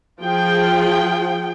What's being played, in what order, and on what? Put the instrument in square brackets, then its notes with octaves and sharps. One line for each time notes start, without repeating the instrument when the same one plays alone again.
[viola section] F3 F4 G#4 G5